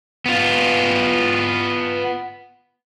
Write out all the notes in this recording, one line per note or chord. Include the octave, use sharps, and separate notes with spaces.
B3 F4